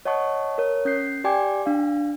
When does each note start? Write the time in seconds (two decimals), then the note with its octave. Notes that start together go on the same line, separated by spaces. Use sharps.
0.05 C#5 D#5 F#5 A5 C#6
0.58 A#4 C#5
0.85 C#4 G6 B6 C7
1.24 G4 D5 G5 G#5 D6 G#6
1.66 D4 F5